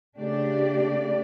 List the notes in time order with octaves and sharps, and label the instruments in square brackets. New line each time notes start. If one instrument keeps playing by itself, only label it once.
[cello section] C#3 A3 D4 G4 D5